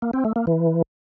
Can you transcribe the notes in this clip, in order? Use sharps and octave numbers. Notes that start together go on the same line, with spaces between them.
A#3
C4
A3
A#3
E3